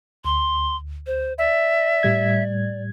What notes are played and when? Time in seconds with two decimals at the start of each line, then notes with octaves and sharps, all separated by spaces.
0.25 D2 C6
1.07 C5
1.38 D5 E5
2.03 A2 G3 G#6